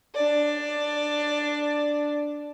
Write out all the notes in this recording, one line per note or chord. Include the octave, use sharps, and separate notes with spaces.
D4 D5